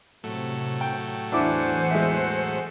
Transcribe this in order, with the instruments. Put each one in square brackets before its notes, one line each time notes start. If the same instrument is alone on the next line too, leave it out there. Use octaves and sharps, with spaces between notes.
[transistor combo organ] A2 F#3 A3 [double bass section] C3
[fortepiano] G5
[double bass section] E2 [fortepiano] D4 E4 D6 [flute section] C5 F#5 G#5
[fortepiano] G#3 E5